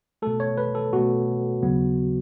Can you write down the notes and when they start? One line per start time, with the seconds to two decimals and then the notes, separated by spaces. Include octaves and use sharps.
0.22 B2 A3 A4
0.40 C#5
0.58 B4
0.75 A4
0.93 B2 A3 F#4
1.62 D#2 C#3 F#3 B3